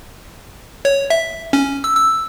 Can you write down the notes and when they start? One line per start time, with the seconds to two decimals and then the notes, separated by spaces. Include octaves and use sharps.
0.85 C#5
1.10 E5
1.53 C#4
1.84 E6
1.96 E6